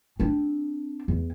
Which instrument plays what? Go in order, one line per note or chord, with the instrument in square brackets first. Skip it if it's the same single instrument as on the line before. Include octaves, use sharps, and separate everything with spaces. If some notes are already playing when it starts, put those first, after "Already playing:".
[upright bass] C4 D4
E2